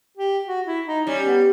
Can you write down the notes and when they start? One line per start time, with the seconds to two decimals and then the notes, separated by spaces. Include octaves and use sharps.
0.17 G4
0.47 F#4
0.66 E4
0.86 D#4
1.07 G3 C#4
1.26 B3